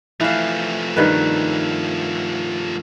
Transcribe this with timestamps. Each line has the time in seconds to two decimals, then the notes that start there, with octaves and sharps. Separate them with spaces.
0.21 E3 F3 A3 F5
0.96 G2 D#3 B4